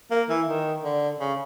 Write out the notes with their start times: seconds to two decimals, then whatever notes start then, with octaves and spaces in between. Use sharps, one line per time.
0.11 A#3
0.29 E3
0.47 D#3
0.83 D3
1.20 C#3